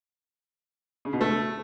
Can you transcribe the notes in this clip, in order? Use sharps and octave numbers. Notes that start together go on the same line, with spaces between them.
C#3
B2
A3